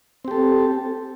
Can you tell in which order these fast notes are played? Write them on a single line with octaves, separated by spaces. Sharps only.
C4 G4 A4